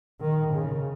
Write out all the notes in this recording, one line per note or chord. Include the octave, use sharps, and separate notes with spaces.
D#3
C#3